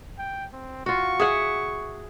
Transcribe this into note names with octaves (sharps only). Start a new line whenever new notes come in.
G5
C4
F4 F#4 C#6
G#4 E5 F#5